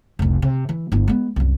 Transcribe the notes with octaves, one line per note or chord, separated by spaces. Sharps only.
F1 C2
C3
E3
G1 E4
G#3 B3
C2 F#2